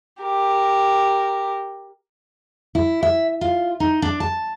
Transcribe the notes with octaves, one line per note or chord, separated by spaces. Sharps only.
G4 A#4
E4
E5
F4
D#4
D4
A5